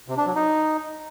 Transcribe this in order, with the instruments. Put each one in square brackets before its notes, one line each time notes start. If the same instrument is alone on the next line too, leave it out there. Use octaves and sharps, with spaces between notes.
[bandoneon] C3
D4
F#3
D#4